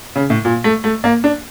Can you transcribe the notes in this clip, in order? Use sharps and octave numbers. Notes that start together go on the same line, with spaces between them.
C#3
A2
A#2
A3
A3
A#3
D4